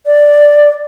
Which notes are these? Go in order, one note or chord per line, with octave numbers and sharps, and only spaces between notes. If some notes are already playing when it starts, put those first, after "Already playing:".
D5